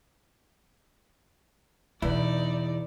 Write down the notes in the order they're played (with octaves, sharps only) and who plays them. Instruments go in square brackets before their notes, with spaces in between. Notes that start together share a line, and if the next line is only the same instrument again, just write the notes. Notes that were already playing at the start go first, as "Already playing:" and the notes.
[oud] E2 [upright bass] B2 B3 [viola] D#4 D5 [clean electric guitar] E4